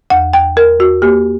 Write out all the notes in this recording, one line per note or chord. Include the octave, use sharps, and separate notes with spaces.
E2 F#5
E2 G5
E2 A#4
E2 F#4
A#3 G4